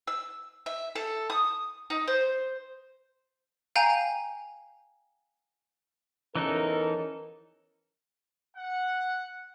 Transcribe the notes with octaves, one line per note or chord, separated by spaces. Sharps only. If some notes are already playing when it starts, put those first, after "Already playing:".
E6
E5
A4
D#6
D#4
C5
F5 G5 G#5 A#5 G6
E2 E3 C#4 D#4 A4 A#4
F#5